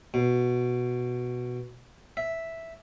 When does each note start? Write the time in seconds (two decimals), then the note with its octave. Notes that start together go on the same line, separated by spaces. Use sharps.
0.14 B2
2.17 E5